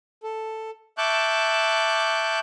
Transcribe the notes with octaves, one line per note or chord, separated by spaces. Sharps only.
A4
E5 A5 C#6 D6 F#6 G6